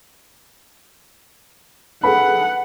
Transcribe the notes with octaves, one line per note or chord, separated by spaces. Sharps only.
G#4 A4 B4 F#5 B5